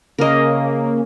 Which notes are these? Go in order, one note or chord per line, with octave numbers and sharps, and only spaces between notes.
C#3 A#3 C#4 A#4 D#5